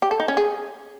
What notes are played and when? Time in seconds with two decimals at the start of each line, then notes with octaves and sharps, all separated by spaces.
0.02 G4
0.11 A4
0.20 D#4
0.28 C#4
0.37 G#4